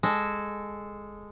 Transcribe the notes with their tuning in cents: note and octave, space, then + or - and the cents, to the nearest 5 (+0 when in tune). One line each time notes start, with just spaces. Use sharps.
G#3 -10 A4 -15